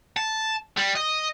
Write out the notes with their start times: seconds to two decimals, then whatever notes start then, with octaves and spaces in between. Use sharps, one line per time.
0.17 A5
0.77 G3
0.95 D#5